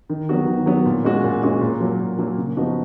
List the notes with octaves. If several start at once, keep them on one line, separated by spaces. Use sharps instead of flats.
D#3
F#3 B3 F#4
D#3
F#3 B3 F#4
A#2
G#3 C#4 F#4
A#2
G#3 C#4 F#4
A#2
F#3 A#3
A#2
F#3 A#3
C#3
F3 B3 D#4 F#4